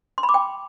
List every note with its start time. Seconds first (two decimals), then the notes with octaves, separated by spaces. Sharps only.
0.18 C6
0.23 B5
0.29 D6
0.34 G5